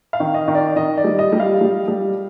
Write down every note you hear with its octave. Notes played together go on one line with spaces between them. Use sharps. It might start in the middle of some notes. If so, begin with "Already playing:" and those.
F5
D#3
D#5
D#3
D5
D#3 D#5
D5
G3
D#5
G3
F5
G3
G3